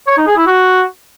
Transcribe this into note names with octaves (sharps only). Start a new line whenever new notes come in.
C#5
D#4
G#4
E4
F#4